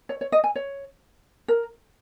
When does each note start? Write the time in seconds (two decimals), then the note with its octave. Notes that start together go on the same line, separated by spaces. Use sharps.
0.09 C#5
0.21 C#5
0.32 D#5
0.44 G#5
0.56 C#5
1.48 A#4